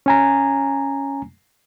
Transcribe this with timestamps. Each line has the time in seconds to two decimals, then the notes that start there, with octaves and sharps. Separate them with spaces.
0.06 C#4 G#5 A#5